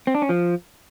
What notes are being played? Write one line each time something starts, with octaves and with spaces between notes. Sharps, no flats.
C4
D4
C#4
F3